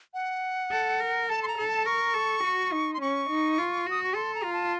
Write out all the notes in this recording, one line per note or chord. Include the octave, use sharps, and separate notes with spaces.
F#5
A4
A#4
A4 A5
C6
A#5
A4
A5
A#4 C#6
A4
F#4
D#4
C6
C#4 C#6
D#4
F4
F#4 D#6
C#6
A4 C6
A#5
F4
A5